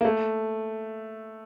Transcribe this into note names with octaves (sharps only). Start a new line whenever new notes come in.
A#3
A3